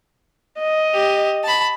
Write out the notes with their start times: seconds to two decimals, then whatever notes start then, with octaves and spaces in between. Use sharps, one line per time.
0.59 D#5
0.94 G4
1.44 A5 B5